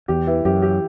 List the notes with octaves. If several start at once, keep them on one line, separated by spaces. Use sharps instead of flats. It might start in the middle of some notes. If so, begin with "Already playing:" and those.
E2 G4
E3
F#2 G4
G4